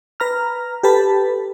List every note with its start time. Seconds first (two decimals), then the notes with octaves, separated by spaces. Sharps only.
0.20 B4 A#5 F6
0.83 G4 A4 B4 A5 B5